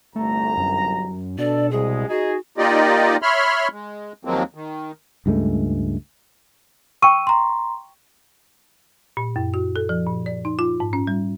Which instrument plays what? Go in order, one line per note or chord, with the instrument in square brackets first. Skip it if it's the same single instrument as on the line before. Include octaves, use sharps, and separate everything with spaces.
[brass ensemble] G1 C2 A#5 [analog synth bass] A3
[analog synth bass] F#2
[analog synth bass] B2 [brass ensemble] D4 A4 [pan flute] D5
[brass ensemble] C2 G#3 [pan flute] G#4
[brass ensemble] D#4 G#4 [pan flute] F#4
[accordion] A#3 D#4 F4 G4 D5 D#5
C#5 E5 B5 C6 F6
G#3
D#2 F3 F#3 G#3 A#3 C4
D#3
[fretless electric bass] C#2 G2 G#3 A3
[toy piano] G5 C#6 [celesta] E6 D#7
[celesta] A#5 C6
[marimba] A#2
F#2
F#4
A4
F3
A#2
D5
D#4
F4
G#2
C#4
G3